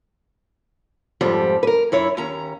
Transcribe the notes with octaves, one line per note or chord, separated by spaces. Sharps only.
F2 G#2 F3 G3
A#4 B4
F#2 E4 C#5
D#2 C#4 A#5